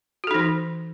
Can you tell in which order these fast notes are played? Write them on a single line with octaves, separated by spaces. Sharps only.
F#4 A4 D#4 E3